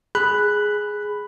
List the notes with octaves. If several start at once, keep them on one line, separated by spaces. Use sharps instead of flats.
G#4 B5 F#6